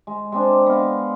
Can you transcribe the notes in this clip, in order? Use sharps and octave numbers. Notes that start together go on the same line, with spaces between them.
G#3
G#3 C4 D4
B3 D#5 F5